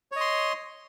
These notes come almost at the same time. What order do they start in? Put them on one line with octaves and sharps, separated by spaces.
C#5 D#5 C6